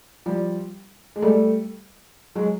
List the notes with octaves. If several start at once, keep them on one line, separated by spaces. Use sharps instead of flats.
F3 G3
G#3
G3 A3
F#3 G#3